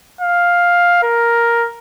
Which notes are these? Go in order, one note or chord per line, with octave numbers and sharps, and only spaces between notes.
F5
A#4